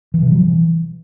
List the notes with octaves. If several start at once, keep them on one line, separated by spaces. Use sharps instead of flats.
E3
C3
F#3
E3